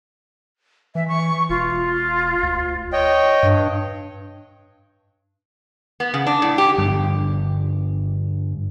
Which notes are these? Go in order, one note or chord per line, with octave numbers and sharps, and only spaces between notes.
E3 E5
C#6
E1 F4
D2
C#5 D#5 G5
G2
B3
C#3
D4
A2
G4
G2 D3 F3